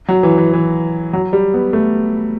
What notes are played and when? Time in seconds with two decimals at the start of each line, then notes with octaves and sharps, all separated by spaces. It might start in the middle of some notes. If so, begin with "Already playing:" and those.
0.09 F#3
0.23 E3
0.38 E3
0.53 E3
1.13 F#3
1.33 G3
1.54 B3
1.73 A3